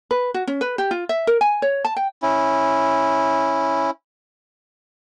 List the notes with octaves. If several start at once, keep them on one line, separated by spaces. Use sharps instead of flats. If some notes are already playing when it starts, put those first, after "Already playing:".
B4
F#4
C#4
B4
G4
F4
E5
A#4
G#5
C#5
A5
G5
C#4 E4